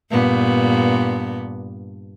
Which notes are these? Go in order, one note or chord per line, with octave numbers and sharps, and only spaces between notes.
G2 A#2 B3